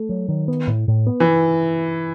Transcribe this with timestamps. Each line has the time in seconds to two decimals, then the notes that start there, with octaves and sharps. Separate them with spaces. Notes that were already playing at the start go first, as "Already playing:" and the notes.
Already playing: A3
0.09 F#3
0.29 D#3
0.48 B3
0.67 A2
0.88 A2
1.07 B3
1.20 E3